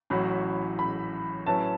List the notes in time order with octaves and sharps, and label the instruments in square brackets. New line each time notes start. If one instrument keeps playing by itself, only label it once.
[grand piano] A1 A2 F#3 C#4 F#4 [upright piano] B5
[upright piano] B5
[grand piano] A2 F#3 C#4 E4 B4 [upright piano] A5